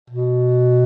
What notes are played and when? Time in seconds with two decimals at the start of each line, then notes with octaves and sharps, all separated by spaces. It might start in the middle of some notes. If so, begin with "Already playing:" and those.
0.10 B2